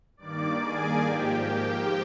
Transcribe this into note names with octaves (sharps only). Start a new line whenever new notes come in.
G2 D#3 A#3 D5 D6
G#4 G#5
G#2 F3 A#3 G4 G5